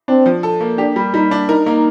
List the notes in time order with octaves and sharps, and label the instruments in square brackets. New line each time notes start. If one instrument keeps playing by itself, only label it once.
[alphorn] C4 [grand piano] D4
[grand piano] F3
A4
A#3
[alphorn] D4 [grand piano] G4
[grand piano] G3
[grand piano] G3 [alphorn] D#4
[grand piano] D4
[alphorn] D#4 [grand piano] A#4
[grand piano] A#3